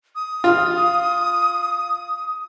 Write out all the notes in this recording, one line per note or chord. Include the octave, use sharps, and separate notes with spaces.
D#6
F4